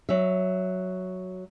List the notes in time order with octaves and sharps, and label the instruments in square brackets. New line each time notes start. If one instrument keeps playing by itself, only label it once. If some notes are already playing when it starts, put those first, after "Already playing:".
[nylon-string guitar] F#3 E5